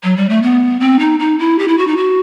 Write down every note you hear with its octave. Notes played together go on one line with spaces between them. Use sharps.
F#3
G3
A3
B3
C4
D#4
D#4
E4
G4
E4
F#4
D#4
F#4